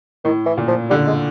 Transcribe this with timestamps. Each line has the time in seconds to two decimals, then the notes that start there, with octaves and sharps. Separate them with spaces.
0.24 A2 D#3
0.46 E3
0.58 A#2
0.68 F3
0.90 D3 G3
1.07 G#3